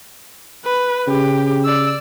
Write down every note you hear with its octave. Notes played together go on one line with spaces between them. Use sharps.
B4
C#3 G4
D5 E6